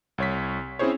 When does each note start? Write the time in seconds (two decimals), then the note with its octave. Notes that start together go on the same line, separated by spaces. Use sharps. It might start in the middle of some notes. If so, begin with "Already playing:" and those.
0.18 C2 C#5 B6
0.79 C4 C#4 E4 G#4 C5 C#5